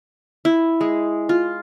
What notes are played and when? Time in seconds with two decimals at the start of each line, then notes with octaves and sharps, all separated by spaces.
0.45 E4
0.81 G#3
1.29 F4